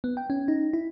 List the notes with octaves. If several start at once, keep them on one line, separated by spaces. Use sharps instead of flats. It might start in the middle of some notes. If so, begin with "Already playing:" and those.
B3
G5
C#4
D#4
E4